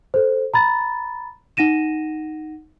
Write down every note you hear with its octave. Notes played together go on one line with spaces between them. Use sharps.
A4 C5
A#5 B5 A6
D#4 F#5 A#6 D#7 E7